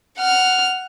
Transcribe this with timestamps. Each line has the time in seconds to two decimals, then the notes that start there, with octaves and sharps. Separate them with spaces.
0.18 F#5 F6